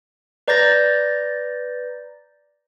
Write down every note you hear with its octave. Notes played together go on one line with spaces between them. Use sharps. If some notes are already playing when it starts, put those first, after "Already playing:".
B4 D5 A#5 G6 A6 A#6